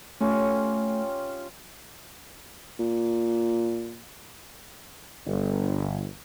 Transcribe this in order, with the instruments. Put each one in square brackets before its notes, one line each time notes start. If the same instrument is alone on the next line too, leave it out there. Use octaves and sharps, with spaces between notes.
[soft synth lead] A3 [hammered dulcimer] C#4 F4 G4
[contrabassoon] A#2
[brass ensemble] G1